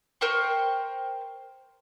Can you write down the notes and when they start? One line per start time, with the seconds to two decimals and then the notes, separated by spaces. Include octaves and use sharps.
0.21 A#4 C5 G5 C#6